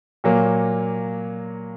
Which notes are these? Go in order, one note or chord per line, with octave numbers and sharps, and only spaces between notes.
A#2 F#3 A#3